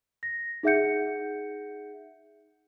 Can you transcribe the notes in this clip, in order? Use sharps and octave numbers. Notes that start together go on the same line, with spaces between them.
A#6
D#4 G#4 E5 F#5 G6 C#7